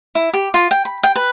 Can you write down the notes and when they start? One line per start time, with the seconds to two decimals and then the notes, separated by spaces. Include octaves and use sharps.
0.15 E4
0.33 G4
0.54 F4
0.71 G5
0.85 B5
1.03 G5
1.15 B4